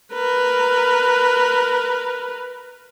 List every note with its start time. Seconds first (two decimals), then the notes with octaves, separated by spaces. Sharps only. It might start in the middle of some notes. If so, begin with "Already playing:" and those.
0.14 A#4 B4